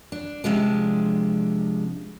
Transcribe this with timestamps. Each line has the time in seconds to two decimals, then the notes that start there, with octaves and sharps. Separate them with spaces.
0.12 D4
0.44 C3 F3 G#3 D4